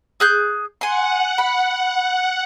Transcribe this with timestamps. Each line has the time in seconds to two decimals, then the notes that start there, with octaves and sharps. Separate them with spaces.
0.20 G#4 F#6 G6
0.81 F#5 G#5 C6
1.38 B5